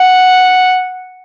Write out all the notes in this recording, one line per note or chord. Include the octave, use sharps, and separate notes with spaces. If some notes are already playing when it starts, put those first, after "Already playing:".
Already playing: F#5